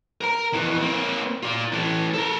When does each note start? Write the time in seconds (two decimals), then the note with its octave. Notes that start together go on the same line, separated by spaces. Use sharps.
0.21 A#4 A#5
0.53 F2 E3
0.82 A#3 C4
1.43 F4 D5
1.72 E3 A3
2.14 A4 A#4